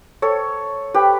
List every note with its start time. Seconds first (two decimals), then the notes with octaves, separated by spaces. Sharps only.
0.22 A4 C#5
0.94 G4 B4